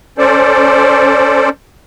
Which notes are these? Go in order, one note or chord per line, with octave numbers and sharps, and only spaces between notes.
C#4 A4 C5 D5